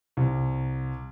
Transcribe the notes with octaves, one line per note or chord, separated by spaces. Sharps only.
C2